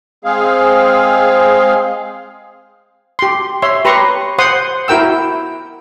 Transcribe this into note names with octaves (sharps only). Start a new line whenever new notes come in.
G#3 C4 G#4 F5
G4 C6
C#5 E5 C6
G4 B4 A#5 C6 C#6
C5 F#5 C6 D#6
E4 F#4 A#4 G5 E6